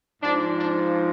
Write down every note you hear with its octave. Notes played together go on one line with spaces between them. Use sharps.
G#2 F3 D4
D4